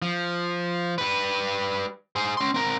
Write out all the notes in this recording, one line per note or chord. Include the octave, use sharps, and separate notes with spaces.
F3
G3 B4
G#4 C5
C#4 C6
C4 A#4